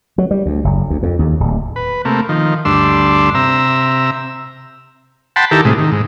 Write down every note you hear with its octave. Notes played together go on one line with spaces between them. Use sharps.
F#3
G3
D2
F#1
D2
F2
D#2
D1
B4
C3 A3 A#3
D#3 F3
D2 G2 D4 C6 E6
C3 E5 A#5 E6
F#5 G5 A5 B5 C6
D#3 E4 G4 A4 A#4
A2 C3 G#3
D#3
G#2